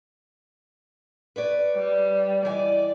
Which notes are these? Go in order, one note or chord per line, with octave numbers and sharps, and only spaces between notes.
B4 C#5 D5
G3
E3 D5 D#5 G#5